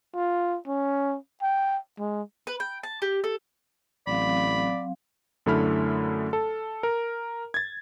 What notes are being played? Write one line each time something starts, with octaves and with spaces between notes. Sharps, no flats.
F4
C#4
G5
G#3
B4
G5
A5
G4
A4
A1 F#3 C4 D5 F5 B5
F#2 D3 A3 E4 B5 F6
A4
A#4
G#6 A6